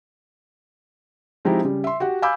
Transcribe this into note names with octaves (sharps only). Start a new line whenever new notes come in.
F3 G#3 C4 D#4 E4 G4
C#3 G3
E5 C6
F#4 G4 F#5
F5 G#5 B5 D6 E6 G6